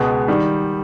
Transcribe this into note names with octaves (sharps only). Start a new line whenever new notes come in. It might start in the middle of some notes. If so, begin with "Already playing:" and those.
Already playing: C#2 B2 G#3 B3
D#3 G3